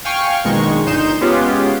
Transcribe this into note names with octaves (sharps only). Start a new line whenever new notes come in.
F5 G5 G#5 C#6 F6
A#1 B2 D#3 G#3 C#6
G1 A#2 D#4 C6 G6 E7
G#3 B3 C#4 F4 G4